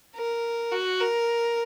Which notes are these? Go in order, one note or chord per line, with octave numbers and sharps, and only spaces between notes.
A#4
F#4
A#4